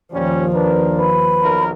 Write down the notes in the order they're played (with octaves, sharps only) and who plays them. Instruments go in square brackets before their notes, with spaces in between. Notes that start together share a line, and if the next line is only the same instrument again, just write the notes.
[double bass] D#2 F3 [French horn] A#2 [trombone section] G3 C#4
[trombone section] D4 A#4 [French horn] B4
[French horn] B4 [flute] B5
[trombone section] B1 A#4